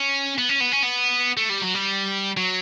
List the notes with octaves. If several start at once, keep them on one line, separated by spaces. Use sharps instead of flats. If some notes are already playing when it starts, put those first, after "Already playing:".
Already playing: C#4
B3
C#4
B3
C#4
B3
A3
G3
F#3
G3
F#3